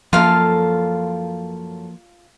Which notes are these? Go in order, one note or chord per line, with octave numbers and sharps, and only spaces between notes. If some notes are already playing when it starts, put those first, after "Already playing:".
F#2 F3 A#3 F4 A4 F5